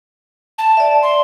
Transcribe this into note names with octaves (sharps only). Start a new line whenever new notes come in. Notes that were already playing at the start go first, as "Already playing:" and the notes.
A5
D5 E5
C6